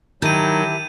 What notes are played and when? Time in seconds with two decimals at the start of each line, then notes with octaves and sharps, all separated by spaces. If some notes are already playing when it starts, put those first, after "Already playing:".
0.22 D#3 F#3 E4 G4 A5 G6 D#7